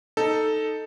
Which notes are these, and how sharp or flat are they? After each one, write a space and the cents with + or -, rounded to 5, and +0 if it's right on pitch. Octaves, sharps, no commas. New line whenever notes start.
D#4 +0 A4 +0